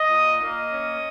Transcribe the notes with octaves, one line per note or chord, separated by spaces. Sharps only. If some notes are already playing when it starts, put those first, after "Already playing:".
Already playing: D#5
A#2
A#3 D#5
C#4